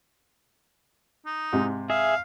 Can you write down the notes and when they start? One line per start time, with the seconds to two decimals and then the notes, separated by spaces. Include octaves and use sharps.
1.26 D#4
1.53 G#2 C3
1.90 G#4 E5 F5